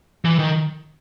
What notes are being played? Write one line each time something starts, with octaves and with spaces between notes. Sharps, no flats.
E3
D#3